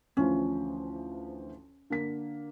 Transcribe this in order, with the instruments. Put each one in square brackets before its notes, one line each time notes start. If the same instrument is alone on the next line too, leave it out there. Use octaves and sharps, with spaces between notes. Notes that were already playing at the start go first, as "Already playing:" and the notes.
[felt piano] D2 E3 F3 [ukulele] C#4
[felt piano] D3 A#3 B6